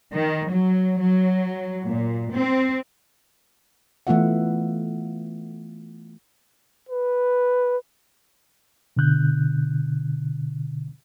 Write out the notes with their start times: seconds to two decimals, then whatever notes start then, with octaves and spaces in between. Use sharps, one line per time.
0.11 D#3
0.50 F#3
1.00 F#3
1.86 A#2
2.35 C4
4.07 E3 A3 B3 F4 E5 F#5
6.89 B4
8.97 B2 D3 F#6 G6